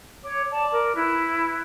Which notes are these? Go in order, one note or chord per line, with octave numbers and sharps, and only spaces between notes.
C#5 D6
D5 A5
A#4
E4 B4